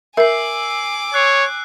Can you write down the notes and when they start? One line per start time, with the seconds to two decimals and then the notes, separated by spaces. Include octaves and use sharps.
0.17 A#4 E5 G#5 D6 E6 C7
1.14 C#5 F#6 C7